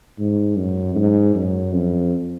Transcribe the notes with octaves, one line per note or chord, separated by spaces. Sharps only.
G#2
F#2
G#2
F#2
F2